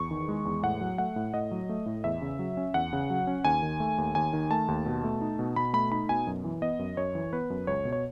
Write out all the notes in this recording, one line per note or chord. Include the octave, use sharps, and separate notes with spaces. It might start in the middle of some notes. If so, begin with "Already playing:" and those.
Already playing: E2 C#6
D#3
G#3
E2
A2 F#5
F#3
A3 F#5
A2
A2 D#5
F#3
A3
A2
E2 E5
C#3
F#3
C#4
E2 F#5
C#3
F#3
C#4
D#2 G#5
D#3
A3
D#2
D#2 G#5
D#3
A3 A5
D#2
B2
A3
D#4
B2
B2 B5
A3 B5
D#4 B5
B2 G#5
F#2
E3
B3 D#5
F#2
F#2 C#5
E3
B3 B4
F#2
C#2 C#5
B2
C#5